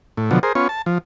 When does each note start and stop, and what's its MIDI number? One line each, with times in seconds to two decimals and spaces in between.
0.17 0.30 45
0.31 0.39 47
0.31 0.39 50
0.31 0.39 53
0.31 0.39 54
0.43 0.53 68
0.43 0.53 70
0.43 0.53 72
0.55 0.68 59
0.55 0.68 61
0.55 0.68 65
0.55 0.68 73
0.69 0.82 81
0.86 0.98 53